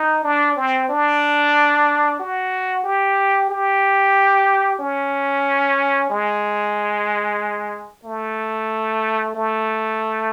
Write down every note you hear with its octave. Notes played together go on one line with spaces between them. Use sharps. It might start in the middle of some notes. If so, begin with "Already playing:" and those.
Already playing: D#4
D4
C4
D4
F#4
G4
G4
C#4
G#3
A3
A3